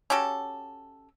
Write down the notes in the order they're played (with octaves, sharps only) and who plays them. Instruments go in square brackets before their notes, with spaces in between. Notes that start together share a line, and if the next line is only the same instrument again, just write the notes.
[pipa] C#4 F#4 G4 A4